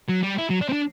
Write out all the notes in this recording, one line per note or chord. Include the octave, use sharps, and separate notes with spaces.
F#3
G3
E4
F#3
D4
C4
D4